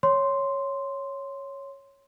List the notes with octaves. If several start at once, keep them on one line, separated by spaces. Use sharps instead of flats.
C#5 C6